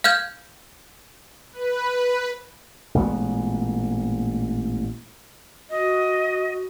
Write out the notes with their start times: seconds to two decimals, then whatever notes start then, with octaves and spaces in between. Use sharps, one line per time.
0.04 F5 F6 G6 G#6
1.53 B4
2.95 A1 A#2 G#3 B3
5.69 F#4 D#5